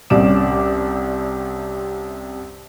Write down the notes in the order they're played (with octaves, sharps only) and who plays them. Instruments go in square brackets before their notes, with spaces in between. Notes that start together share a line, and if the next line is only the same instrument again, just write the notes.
[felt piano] C2 C3 C#4 D5 D6 E7